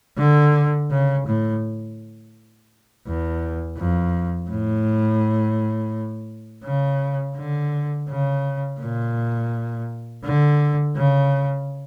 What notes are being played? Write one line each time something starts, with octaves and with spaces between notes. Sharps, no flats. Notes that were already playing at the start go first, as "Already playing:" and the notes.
D3
C#3
A2
E2
F2
A2
C#3
D3
C#3
A#2
D3
C#3